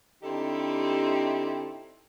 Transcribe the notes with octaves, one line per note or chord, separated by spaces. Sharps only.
D3 C4 D#4 E4 G4 A4